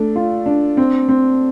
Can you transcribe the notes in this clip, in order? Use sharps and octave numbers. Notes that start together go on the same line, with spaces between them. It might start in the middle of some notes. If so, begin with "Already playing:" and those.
Already playing: A3 D4
F4
D4
C4
C4